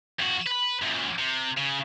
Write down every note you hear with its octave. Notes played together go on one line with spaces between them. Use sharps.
F2 F#4
B4 B5
F#2 A#2
C3
C#3